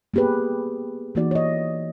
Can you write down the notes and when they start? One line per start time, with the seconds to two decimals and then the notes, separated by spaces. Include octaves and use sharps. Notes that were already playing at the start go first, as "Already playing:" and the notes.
0.14 A#3 B3 G4 G#4 B4
1.15 E3 A#3 D#4 F#4 D5
1.31 C#5 D#5